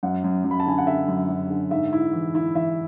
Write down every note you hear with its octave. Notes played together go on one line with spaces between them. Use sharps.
F#2 F#5
F#2
F#2
B5
A5
D3 G#5
F#5
D3 E5
F#2
F#2
D3
G#2 E5
E4
E3
E4
E3 E5